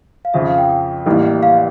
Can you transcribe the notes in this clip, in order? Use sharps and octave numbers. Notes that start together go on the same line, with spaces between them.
F5
F2 C#3 F3 E5
F5
G5
F5
G5
A1 A2 G3 A#3
F5